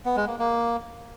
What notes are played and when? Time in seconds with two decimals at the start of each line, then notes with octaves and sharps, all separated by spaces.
0.05 B3
0.16 G#3
0.28 A#3
0.39 A#3